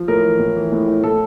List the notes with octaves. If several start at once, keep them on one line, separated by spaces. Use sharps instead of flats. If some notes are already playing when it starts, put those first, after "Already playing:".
Already playing: F3
A2 A#4
E3
A2
E3
A2
A2
A2 A4